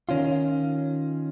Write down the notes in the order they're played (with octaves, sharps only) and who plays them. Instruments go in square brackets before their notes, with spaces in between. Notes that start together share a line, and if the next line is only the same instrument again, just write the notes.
[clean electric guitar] D#3 C#4 F4